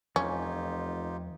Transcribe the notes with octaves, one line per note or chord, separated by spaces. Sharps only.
F1 E2 F3 C#4 D#4 F4 G4 C#5